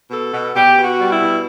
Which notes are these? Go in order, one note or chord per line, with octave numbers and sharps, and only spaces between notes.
B2 A4
B2
B2 G4
B2
F#4
G3
E4
B2